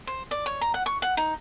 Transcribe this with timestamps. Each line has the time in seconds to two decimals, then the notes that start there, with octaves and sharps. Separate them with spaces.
0.07 C5
0.31 D5
0.46 C#5
0.61 A#5
0.74 F#5
0.86 C#6
1.02 F#5
1.17 D#4